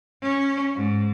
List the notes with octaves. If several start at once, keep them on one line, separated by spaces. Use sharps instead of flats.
C#4
G#2